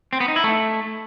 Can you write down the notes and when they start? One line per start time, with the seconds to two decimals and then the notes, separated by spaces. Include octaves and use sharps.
0.13 C4
0.20 B3
0.28 D#4
0.36 E4
0.44 A3